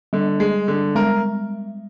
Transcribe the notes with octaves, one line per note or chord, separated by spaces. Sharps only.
D3 G3
G#3
D3
G#3 A#4